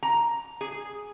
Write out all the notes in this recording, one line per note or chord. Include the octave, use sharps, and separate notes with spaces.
A#5
G#4